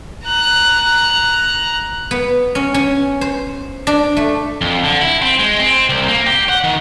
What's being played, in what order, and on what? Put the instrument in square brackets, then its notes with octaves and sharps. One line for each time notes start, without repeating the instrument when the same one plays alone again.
[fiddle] A#5 F#6
[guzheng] B3
C#4
C#4
C5
D4
A3
[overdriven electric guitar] F2
D3
E4
C4
G#3
C4
C2
A#3
G4
F#5
D#3